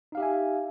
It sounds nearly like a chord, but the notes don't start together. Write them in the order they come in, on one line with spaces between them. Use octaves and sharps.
D#4 F5 G4 E5 G#5